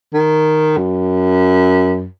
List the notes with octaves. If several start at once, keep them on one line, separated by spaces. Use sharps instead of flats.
D#3
F#2